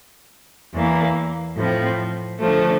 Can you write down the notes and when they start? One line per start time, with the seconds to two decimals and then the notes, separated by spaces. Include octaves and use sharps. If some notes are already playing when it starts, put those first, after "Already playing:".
0.73 E2 E3 A#3
1.56 A2 F3 C4
2.39 D3 F3 A3